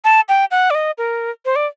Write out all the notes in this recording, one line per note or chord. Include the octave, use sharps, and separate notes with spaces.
A5
G5
F#5
D5
D#5
A#4
C5
D5